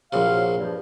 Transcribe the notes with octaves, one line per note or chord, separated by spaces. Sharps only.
A#1 C3 F#3 F5
G2 F3